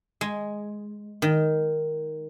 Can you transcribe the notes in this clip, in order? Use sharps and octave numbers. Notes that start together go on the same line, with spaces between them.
G#3
D#3